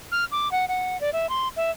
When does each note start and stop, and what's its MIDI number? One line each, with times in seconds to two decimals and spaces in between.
0.12 0.25 89
0.32 0.51 86
0.52 0.65 78
0.68 0.99 78
1.01 1.10 74
1.13 1.29 76
1.29 1.48 84
1.57 1.71 76